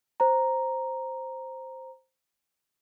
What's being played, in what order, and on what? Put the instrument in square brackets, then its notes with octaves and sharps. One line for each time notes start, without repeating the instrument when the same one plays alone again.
[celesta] C5 A#5